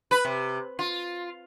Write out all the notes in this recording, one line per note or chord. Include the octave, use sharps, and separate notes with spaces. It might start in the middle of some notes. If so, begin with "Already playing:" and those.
B4
C3
F4